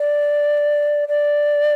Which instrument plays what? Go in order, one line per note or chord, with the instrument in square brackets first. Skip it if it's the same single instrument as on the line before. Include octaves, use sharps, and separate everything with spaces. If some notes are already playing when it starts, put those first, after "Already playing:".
Already playing: [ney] D5
D5